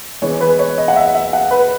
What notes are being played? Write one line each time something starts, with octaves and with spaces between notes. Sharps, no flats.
E3 G#3 B3 C#5
B4
C#5
D#5
F#5
E5
E5
F#5
B4